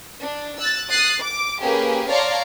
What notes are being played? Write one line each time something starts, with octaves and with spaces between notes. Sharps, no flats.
D4
E6 F#6 A6
D#6 F#6 A6 C7
D6
A#3 C#4 G4 G#4 B4
C#5 D5 F5 A5 A#5 C6